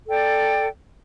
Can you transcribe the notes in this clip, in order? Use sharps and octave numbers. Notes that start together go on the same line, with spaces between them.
A4 D5 G5